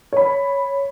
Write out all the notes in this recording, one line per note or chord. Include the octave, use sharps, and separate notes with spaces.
C#5 B5